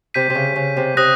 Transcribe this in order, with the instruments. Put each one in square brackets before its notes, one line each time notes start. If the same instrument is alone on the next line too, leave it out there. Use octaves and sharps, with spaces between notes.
[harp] C3 [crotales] G6 B6 D#7
[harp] C3
C#3
C#3
C3
[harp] C3 [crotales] D#6 F#6 A#6